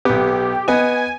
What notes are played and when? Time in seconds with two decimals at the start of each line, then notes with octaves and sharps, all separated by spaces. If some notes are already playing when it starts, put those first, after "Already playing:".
0.05 B1 B3 G4
0.68 B3 D#5 G#5